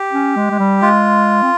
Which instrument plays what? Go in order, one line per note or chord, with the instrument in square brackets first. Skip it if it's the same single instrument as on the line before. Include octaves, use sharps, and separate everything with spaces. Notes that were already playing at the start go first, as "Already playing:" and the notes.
Already playing: [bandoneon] G4
[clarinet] C#4
G#3
G#3
G3
[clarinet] G#3 [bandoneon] F4
[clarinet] C4